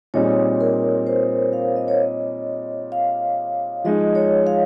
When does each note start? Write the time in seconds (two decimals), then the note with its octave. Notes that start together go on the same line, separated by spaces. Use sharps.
0.14 A#2 G3 C4 D#4 G#4 C#5
0.60 A#4
1.07 C5
1.53 F5
1.76 D#5
1.88 C#5
2.01 D#5
2.92 F5
3.84 F3 G#3 D#4 D#5
4.15 C#5
4.47 F5